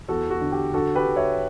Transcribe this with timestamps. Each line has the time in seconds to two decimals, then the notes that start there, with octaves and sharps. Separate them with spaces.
0.08 E2 F#4 A4
0.30 F#4
0.41 D3
0.52 G4
0.73 D3 F#4 A4
0.95 G4 B4
1.06 D3
1.16 C#5 E5